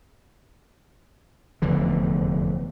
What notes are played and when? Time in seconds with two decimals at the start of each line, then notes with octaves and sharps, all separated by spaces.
1.62 F1 E2 D3 E3